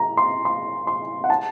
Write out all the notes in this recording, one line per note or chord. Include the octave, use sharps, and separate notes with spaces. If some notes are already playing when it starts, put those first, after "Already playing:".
Already playing: A#5
C6
C6
C6
F#5
A5